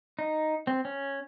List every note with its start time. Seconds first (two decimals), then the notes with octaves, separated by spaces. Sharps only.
0.19 D#4
0.67 C4
0.85 C#4